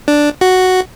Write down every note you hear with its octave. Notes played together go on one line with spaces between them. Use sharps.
D4
F#4